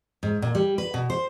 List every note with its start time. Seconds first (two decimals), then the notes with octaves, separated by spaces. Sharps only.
0.23 G#2
0.42 A#2
0.55 G3
0.78 B4
0.94 B2
1.10 C5